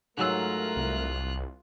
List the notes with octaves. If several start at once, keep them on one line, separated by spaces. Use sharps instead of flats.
G#2 F#3 A3 F4 A#4 E6 F#6
C2